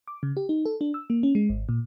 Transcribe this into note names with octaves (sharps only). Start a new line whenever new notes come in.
D6
C#3
G4
D#4
A4
D4
E6
A#3
C#4
G#3
G#1
A#2